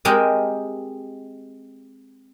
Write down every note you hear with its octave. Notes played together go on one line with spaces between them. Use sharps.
G#3 C4 G4 A#4 D#5